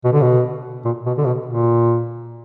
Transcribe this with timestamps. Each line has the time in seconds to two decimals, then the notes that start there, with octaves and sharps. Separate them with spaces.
0.04 B2
0.13 D3
0.21 B2
0.85 A#2
1.06 B2
1.18 D3
1.25 B2
1.46 A#2